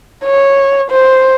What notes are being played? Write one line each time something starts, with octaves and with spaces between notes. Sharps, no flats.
C#5
C5